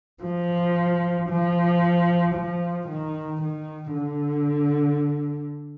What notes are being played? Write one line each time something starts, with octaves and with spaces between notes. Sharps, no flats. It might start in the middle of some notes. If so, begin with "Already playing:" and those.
F3
F3
F3
D#3
D#3
D3